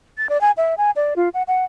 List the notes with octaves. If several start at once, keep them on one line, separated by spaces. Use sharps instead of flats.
A6
D5
G#5
E5
G#5
D5
F4
F#5
F#5